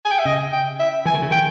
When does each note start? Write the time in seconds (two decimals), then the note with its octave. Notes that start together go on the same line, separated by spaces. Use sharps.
0.05 G#5
0.11 G5
0.19 E5
0.25 C#3 D#5
0.53 G5
0.80 E5
1.05 E3 G#5
1.14 D#3
1.22 C#3
1.31 D#3 G5